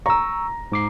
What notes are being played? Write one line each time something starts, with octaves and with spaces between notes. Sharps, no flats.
A#5 C#6 E6
G#2 D6 C7